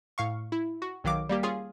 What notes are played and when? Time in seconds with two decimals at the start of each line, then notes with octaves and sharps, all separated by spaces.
0.18 A2 F5 C#6
0.52 E4
0.82 F#4
1.04 B1 D#3 F#3 F5 D6
1.29 G3 A#3 G4
1.43 C#4 F4 G#4 F5 G#5